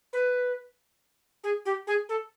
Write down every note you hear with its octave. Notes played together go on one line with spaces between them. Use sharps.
B4
G#4
G4
G#4
A4